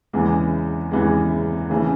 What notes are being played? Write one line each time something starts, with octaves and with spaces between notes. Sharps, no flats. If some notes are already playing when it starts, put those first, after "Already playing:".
E2 C#3 E3 G#3
E2 C#3 E3 G#3
C#3 E3 A3